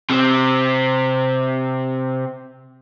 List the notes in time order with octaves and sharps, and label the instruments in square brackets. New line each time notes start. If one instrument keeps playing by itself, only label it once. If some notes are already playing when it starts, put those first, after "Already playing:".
[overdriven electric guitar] C3 C4